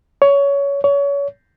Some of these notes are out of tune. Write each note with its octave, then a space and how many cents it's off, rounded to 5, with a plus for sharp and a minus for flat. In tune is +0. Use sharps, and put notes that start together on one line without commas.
C#5 +20
C#5 +30